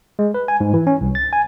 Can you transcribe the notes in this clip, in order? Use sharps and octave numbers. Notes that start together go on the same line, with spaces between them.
G#3
B4
G#5
G#2
E3
C#4
C2
A6
G#5